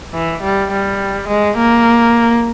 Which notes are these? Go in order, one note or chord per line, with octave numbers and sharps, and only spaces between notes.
E3
G3
G3
G#3
A#3